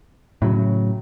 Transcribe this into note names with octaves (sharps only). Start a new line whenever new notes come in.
A2 C#3 F#3